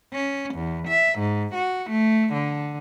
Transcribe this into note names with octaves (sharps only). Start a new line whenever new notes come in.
C#4
E2
E5
G#2
F#4
A3
D3